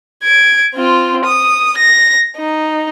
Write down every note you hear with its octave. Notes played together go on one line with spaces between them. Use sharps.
G#6 D7
C4 F4
D#6
A#6
D#4